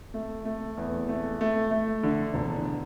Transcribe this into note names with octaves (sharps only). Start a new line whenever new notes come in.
A3
A3
E2
A3
A3
A3
D3
E1